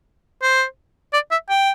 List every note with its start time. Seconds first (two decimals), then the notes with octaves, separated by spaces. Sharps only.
0.43 C5
1.13 D5
1.31 E5
1.49 G5